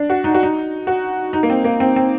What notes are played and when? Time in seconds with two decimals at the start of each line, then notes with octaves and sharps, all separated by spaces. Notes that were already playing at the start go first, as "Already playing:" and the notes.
Already playing: D4
0.10 F#4
0.24 D#4
0.34 F#4
0.43 D#4
0.87 F#4
1.33 D#4
1.43 A#3
1.50 C4
1.64 A#3
1.80 C4
1.96 C4